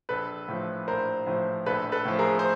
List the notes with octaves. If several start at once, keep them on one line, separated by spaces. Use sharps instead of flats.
A#1 A4 B4
A2 F3
A#1 A#4 C5
A2 F3
A#1 A4 B4
A4 B4
A2 F3
G#4 A#4
C5